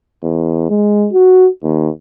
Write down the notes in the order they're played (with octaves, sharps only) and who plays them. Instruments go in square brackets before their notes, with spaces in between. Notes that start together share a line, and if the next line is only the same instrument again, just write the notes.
[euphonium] E2
G#3
F#4
D#2